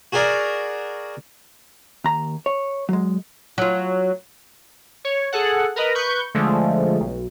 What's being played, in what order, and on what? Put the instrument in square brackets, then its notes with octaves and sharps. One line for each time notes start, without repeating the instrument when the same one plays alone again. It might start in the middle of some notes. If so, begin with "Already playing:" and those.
[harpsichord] F#4 G#4 A#4 D5
[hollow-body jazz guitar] D#2 A#5
C#5
F#3 G#3
[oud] F#3 F4
[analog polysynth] C#5
G#4 A4 F#5
A#4 B4 D#5
B4 C#6 G6
D3 F3 G#3 A3
B1